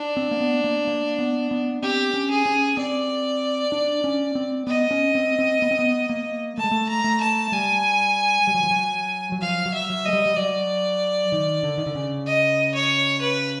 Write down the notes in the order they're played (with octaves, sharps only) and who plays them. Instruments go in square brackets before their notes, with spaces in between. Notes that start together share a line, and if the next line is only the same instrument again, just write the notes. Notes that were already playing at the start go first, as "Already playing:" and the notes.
Already playing: [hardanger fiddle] D4
[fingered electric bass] C4
A#3
B3
A#3
A#3
B3
B3
[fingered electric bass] C4 [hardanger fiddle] G4
[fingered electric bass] C#4
[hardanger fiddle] G#4
[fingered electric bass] C#4
[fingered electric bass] C4 [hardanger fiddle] D5
[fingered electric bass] D4
C#4
C4
[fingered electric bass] B3 [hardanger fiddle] D#5
[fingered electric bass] C#4
C4
C4
B3
C4
B3
A#3
[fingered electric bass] A3 [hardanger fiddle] A5
[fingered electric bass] G#3
A3
[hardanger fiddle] A#5
[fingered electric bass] A3
[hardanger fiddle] A5
[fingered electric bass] G3 [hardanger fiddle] G#5
[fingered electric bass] G3
F#3
F3
F#3
F#3
[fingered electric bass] F3 [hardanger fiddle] F5
[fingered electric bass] F#3
[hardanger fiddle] E5
[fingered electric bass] F#3
[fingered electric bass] G#3 [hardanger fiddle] D#5
[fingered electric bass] G3
G3
[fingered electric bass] F#3 [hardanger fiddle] D5
[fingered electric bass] D#3
D3
D#3
D3
C#3
[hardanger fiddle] D#5
C#5
B4